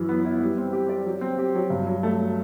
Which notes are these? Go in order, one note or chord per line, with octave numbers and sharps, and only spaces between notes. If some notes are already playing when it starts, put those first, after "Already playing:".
Already playing: F#2 E3
B3
E4
G3
C4
G4
D5
F#3
C4
G4
F#3
G2
F#3
A3